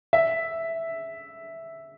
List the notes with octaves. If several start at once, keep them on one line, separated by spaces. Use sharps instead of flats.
E5